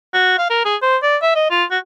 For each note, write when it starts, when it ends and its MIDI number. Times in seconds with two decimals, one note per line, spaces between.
0.14 0.35 66
0.38 0.49 77
0.50 0.63 70
0.65 0.76 68
0.82 0.97 72
1.03 1.17 74
1.22 1.31 76
1.35 1.48 75
1.50 1.64 65
1.71 1.78 66